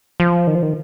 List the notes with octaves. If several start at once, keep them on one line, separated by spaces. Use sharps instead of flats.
F3
D#3
F3
D#3